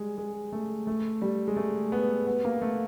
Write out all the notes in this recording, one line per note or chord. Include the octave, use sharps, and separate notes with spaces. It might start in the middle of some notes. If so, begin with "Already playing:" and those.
Already playing: G3 G#3
G#3
A3
A3
G3
G#3
A3
B3
B3
A#3
A3